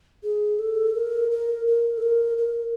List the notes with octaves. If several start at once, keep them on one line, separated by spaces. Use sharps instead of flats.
G#4
A4
A#4
A#4
A#4
A4
A#4
A#4